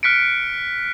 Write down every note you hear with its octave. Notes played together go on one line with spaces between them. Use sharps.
F6 F#6 B6 C#7 D7